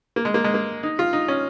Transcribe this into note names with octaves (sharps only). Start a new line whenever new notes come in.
A#3
G#3
A#3
G#3
A#3
D#4
F4
D#4
C#4